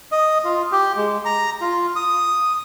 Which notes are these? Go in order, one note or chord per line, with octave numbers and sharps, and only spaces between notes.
D#5
F4
G4
G#3
A#5
F4
D#6